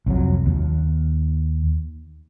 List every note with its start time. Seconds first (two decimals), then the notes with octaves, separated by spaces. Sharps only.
0.06 C2 F2 F#3
0.46 D#2